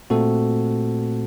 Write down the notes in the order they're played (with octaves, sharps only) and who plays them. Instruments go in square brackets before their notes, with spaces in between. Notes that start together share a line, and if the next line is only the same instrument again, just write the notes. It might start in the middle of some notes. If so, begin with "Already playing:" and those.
[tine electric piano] A#2 A3 C4 F#4 A4